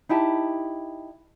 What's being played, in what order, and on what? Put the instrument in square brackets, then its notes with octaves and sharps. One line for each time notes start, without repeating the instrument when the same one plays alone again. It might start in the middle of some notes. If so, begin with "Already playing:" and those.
[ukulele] D#4 E4 G4 A5